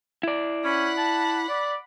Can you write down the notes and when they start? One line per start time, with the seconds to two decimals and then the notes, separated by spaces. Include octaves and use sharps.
0.23 E4 D5
0.64 C#4 F#5 B5
0.98 A5
1.49 D5